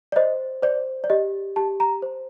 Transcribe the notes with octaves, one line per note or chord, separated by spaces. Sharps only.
D5
C5 D#5
C5 D5
D5
G4 D#5
G4 A5
A#5
C5